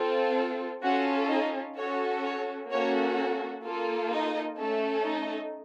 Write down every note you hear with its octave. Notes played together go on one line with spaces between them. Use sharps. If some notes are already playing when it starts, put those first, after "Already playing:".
Already playing: C4 F4 A4
C#4 F4 F#4 A4 F#5
D#4 D#5
C#4 F#4 A4 C#5
C#5
A#3 C#4 F#4 A4 C#5
A#3 F4 A4
D#4 D#5
A3 C#4 A4
D#4 D#5